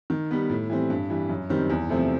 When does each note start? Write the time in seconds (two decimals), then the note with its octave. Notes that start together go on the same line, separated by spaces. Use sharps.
0.10 D#3
0.31 G3 B3
0.50 A2
0.70 E3 G3 C4
0.90 G2
1.10 E3 G3
1.29 F#2
1.49 D#3 G3 C4
1.70 E2
1.89 C3 F3 A3 C4